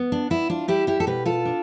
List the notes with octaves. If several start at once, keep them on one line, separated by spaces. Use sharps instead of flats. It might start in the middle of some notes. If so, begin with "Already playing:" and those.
Already playing: B3
D4
B3 E4
D4 F4
G3 E4 G4
E4 G4
A4
B2 G4 B4
F4 A4
D4